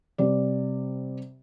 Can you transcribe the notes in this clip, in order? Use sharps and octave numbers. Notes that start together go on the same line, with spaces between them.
C3 G3 D5